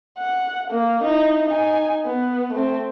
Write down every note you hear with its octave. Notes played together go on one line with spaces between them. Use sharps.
F#5
A#3
D#4 E4
D#4 G#5
B3
A3 C4